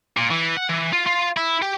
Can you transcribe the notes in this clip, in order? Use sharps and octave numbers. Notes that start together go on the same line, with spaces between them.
A#2
E3
F#5
E3
F4
F4
E4
G4